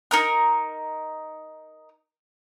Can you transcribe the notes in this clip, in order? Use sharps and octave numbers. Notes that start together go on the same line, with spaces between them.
D#4 A#4 F6